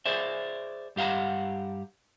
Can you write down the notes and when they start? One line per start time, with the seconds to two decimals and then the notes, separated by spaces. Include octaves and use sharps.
0.06 G#4 C5 D5 E5
0.96 G2 G4 F5 F#5 A#5